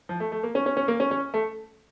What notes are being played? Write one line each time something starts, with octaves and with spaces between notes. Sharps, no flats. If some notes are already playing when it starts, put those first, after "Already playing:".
F3
A3
A3
A#3
C#4
C#4
C#4
A#3
C#4
C#4
A3